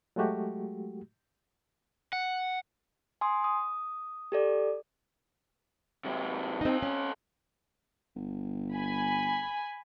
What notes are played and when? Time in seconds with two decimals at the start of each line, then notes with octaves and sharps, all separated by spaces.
0.16 F#3 G#3 A3 F#4 G4
2.13 F#5
3.21 G#5 C6 D#6
3.44 D#6
4.32 G4 A4 D5
6.04 C3 F#3
6.61 C4 D#4 A4 D#5
6.83 C#4
8.15 G1
8.74 G#5 B5